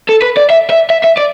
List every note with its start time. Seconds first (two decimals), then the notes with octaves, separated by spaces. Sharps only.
0.09 A4
0.22 B4
0.37 D5
0.50 E5
0.70 E5
0.90 E5
1.04 E5
1.18 D5